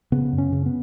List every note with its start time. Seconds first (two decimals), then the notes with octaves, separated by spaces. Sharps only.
0.12 C#3 B3
0.33 F#2
0.38 C#4
0.52 C#3
0.66 B3